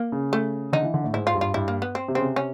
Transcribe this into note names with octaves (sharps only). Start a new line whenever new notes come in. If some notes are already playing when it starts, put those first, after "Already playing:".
Already playing: A#3
C#3
A3
D3 D#4
E3
D3
A2
G#2 E4
F4
G2
F4
G2 E4
A#3
B3
C4
C3
C#3 C4
C3
C#4